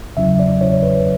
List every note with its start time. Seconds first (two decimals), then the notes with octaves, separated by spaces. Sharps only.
0.17 E2 C#3 F#3 C#4 E4 E5
0.39 D5
0.61 E2 C#3 F#3 C#4 E4 C#5
0.82 B4